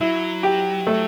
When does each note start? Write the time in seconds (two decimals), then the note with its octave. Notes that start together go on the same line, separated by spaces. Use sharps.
0.01 F#3 E4
0.43 G4
0.87 A3